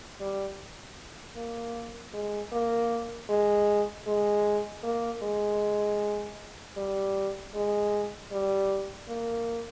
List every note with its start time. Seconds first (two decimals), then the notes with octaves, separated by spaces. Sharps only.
0.20 G3
1.37 A#3
2.14 G#3
2.52 A#3
3.29 G#3
4.07 G#3
4.84 A#3
5.23 G#3
6.77 G3
7.55 G#3
8.32 G3
9.09 A#3